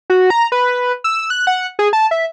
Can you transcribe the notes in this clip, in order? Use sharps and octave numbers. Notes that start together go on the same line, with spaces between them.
F#4
A#5
B4
E6
F#6
F#5
G#4
A5
E5